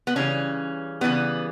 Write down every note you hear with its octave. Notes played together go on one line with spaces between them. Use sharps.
B3
C#3 E3 G3 C#4
C#3 E3 G3 B3